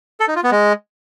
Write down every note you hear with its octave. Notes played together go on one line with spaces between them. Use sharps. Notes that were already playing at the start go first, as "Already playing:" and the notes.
A4
D#4
F4
B3
G#3